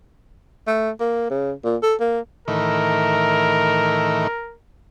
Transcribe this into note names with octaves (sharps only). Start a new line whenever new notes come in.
A3
A#3
C#3
A#2
A4
A#3
A2 D#3 E3 A#4